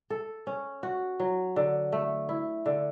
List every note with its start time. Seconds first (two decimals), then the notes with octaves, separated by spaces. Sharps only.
0.10 A4
0.47 C#4
0.83 F#4
1.20 F#3
1.56 D3
1.92 A3
2.29 E4
2.66 D3